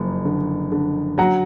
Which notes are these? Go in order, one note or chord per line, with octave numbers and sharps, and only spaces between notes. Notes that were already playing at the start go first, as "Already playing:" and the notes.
Already playing: F#1 F2
D3
D3
F#3 F#5 A#5